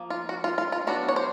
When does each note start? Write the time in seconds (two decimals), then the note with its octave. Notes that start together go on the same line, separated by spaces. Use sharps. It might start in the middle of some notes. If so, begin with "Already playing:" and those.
Already playing: F3 A#3
0.10 F4
0.29 F#4
0.44 F4
0.58 F4
0.72 F4
0.87 F#3 B3 D4 F#4
1.08 C#5
1.16 C5